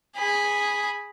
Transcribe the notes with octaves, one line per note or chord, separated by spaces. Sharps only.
G#4 B5